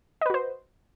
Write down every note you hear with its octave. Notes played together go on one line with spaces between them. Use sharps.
F#4 B4 C5 D#5